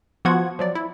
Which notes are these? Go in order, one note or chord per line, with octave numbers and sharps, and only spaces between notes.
F3 B3 F4 F#4 F#5 G#6
F3 F#3 D5
E4